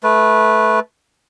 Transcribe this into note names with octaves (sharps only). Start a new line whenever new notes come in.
A3 B4